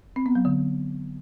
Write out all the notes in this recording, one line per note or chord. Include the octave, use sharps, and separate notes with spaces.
C4
B3
F#3
D3